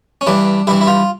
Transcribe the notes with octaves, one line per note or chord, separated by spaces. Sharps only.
C#4
G2 E3 D4
G2 E3 E4
E4
F4